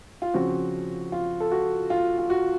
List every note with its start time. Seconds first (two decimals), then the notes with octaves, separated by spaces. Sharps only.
0.22 F4
0.34 C#3 F3 C4 F#4
1.12 F4
1.40 A4
1.52 F#4
1.90 F4
2.19 F4
2.30 F#4